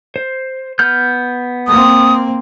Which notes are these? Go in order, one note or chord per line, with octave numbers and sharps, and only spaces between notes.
C5
B3 F6 G6
A#3 C4 D#6